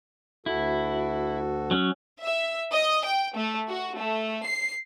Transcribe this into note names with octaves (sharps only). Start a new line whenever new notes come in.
D2 E4 F#4 A4
F#3 C#4
E5
D#5
G5
A3
F#4
A3
C7